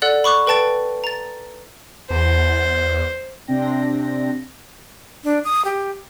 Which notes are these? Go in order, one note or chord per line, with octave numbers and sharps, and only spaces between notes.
A4 D5 F#5 F#6
B5 C#6 D6 F#6
A4 B4 G5 A5 A6 D7
A#5 A6
E2 C5
C3 C4 D4 G5 A#6
D4
D#6
G4